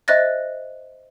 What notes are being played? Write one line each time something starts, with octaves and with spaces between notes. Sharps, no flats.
C5 D#5 E5 F#6 A6 A#6